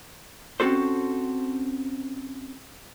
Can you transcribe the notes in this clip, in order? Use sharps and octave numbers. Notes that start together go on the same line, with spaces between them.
C4 C#4 F#4 A4 C5